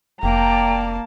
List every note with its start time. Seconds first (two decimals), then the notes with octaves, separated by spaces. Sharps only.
0.23 F1 A#3 D5 G5 A5 A#5